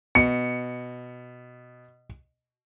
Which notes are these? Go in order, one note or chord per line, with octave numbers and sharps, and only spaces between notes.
B2 C#7